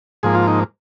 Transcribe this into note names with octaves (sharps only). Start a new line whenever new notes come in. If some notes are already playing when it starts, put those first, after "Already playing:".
G#2 F3 A#3 G#4
F4
D#4